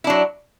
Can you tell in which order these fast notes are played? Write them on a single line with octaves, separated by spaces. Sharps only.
E4 D4 F#3